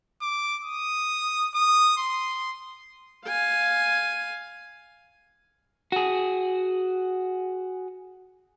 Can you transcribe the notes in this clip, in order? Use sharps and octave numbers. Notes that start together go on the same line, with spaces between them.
D6
D#6
D#6
C6
F5 G#5
F#4 G#4